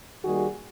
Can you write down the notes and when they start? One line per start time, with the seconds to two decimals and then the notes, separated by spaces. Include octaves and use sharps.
0.24 D#3 G3 A#3 F#4 G#4